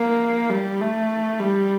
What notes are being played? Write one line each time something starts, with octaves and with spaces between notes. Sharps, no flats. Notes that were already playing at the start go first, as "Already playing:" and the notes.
Already playing: A#3
G3
A3
G3